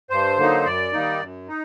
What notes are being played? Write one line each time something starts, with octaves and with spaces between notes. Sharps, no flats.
G2 C5
D3 F#3 A#3 D#4
F#2 D5
D#3 G3 A#3 D#4
F#2
D#4